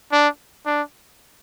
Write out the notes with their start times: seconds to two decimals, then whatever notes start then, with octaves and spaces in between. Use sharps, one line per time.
0.12 D4
0.66 D4